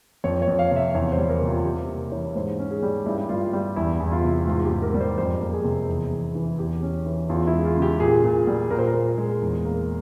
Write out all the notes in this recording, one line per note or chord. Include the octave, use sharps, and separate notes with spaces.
F2 C#5
C#5
F2
F5
C3
E5
E2 C#5
C5
G3
A#4
C3
F4
C3 G4
A#3
E3 C#5
G#2 C5
C#4
G#4
G3
G2 E4
G2 F4
G3
E2 E4
E2
F4
C3
G#2 F4
G4
G#2
A#4
G3
C5
F2 C5
A#3
G#4
C3
E2
E2
E3
E2 G4
C#4
E3
E2 F4
E4
G#3
F4
C#3 G4
A#2 G#4
A#2
G3
A#2 A#4
C5
A#4
A#2
G#3
E2
A#3